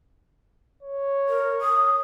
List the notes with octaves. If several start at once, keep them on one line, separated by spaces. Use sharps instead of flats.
C#5
A#4
D#6